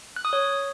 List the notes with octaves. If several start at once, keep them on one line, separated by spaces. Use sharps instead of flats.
F#6
D#6
C#5